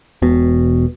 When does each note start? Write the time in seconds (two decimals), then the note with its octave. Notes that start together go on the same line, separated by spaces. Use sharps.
0.22 E1 B2